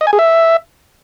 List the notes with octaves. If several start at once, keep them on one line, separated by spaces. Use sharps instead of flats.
D#5
G#5
G#4
E5